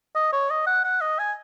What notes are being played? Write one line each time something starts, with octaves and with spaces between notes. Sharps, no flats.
D#5
C#5
D#5
F#5
F#5
D#5
G#5